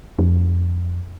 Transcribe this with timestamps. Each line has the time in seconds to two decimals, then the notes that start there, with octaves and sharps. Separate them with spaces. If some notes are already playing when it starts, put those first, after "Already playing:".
0.19 F2